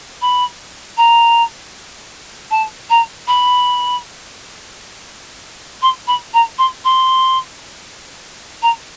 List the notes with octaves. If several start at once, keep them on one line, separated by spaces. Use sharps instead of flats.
B5
A#5
A5
A#5
B5
C6
B5
A#5
C6
C6
A#5